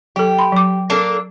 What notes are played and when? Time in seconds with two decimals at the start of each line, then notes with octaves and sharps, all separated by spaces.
0.16 F#3 G4 A4
0.39 B5 C6
0.52 F#3 D6
0.90 A#3 D4 A4